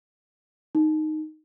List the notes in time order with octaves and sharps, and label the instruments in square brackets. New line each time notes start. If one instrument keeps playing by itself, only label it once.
[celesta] D#4